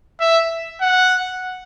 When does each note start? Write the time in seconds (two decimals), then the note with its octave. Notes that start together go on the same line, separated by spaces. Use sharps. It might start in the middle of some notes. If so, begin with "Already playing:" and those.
0.20 E5
0.82 F#5